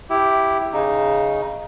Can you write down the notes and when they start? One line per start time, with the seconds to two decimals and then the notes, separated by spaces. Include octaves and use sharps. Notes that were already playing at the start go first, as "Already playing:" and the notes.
0.10 E4 G4
0.73 C#3 D#4